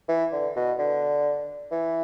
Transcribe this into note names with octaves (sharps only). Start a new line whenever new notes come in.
E3
D3
B2
D3
E3